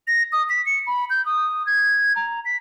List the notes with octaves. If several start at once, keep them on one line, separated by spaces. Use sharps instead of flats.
A#6
D#6
B6
C#7
B5
G6
D#6
G#6
A#5
B6